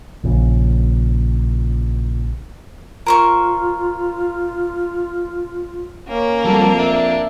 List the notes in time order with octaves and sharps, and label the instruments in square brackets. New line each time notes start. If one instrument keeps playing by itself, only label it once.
[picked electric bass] A#1 C#3
[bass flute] F4 [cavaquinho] A#4 C5 C#6
[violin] A#3 [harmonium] C#4
[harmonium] F2 [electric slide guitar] F#3 G3 F#4 [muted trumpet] A4
[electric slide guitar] D4 [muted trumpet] E5